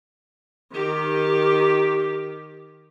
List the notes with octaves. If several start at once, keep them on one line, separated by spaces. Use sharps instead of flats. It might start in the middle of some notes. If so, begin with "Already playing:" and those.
D#3 G4